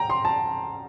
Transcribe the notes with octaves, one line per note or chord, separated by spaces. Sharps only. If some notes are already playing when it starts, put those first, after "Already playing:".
Already playing: G5 A#5
C6
A5